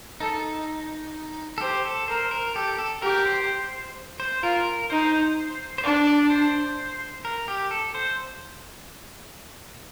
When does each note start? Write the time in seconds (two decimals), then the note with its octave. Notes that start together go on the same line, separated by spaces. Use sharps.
0.20 D#4 A4
1.58 A4
1.61 G4 C5
1.85 A4
2.08 A#4 C5
2.31 A#4
2.55 G4 A4
2.78 A4
3.02 G4 A#4
3.26 C5
4.20 C5
4.43 F4 A#4
4.90 D#4 C5
5.78 C5
5.84 D4 D5
6.07 D5
6.30 C5
7.25 A#4
7.48 G4
7.71 A4
7.95 C5